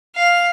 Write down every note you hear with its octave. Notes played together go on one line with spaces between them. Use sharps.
F5